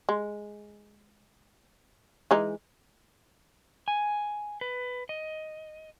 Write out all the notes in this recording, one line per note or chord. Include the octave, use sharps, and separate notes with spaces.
G#3
E3 G#3 D#4
G#5
B4
D#5